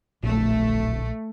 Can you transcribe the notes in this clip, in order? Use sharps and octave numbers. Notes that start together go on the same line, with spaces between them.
D1 A#1 A3